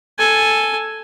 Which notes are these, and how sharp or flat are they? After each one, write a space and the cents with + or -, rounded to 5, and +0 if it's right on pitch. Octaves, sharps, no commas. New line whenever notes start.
A4 +0 G#5 +0